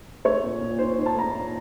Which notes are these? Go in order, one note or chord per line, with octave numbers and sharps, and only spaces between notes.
A3 C#5
A#2
A#2
D#4 C5
C5
D#4
A5
A3 A#5
A#2